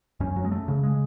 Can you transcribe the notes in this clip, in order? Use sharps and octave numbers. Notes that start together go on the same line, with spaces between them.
F#2 C#4
F#3
G#3
A3
C#3
G#3